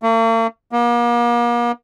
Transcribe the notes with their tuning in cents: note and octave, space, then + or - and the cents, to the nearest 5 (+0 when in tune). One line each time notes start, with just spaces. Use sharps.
A#3 -45
A#3 +40